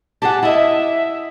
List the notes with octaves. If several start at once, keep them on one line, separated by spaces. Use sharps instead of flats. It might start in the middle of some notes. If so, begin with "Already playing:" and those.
G4 G#4 F#5 A5
E4 D#5 E5